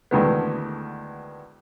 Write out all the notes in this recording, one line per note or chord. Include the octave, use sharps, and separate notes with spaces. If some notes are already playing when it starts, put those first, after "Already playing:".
D2 D#3 E3 G#3 A3 B3